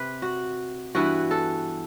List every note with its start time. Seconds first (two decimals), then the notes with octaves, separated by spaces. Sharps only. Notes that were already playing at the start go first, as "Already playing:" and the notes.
Already playing: C3 B4
0.22 F#4
0.95 G2 E3 B3 F#4
1.31 A4